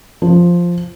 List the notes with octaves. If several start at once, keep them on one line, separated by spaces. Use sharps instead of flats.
F3